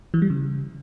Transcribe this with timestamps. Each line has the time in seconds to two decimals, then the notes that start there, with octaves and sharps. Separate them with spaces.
0.14 E3
0.22 G3
0.30 C#3